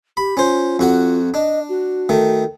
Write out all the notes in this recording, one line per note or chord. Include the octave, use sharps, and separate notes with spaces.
G4 B5
C#4 F4 C5
F2 F#4 F#5
D4 D#5
F#4
D#3 A3